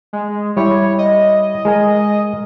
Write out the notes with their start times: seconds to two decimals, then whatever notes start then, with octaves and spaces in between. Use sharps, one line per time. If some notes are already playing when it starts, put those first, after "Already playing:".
0.13 G#3
0.57 G3 E4 G4 C#5
0.99 D#5
1.65 G#3 A#4 G#5